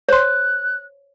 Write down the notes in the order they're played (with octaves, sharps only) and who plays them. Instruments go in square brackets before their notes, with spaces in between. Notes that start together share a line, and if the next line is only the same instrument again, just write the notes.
[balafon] C5 C6 [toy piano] C#5 [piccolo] F#6